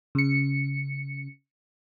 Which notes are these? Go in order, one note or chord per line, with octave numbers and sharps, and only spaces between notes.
C#3 C#7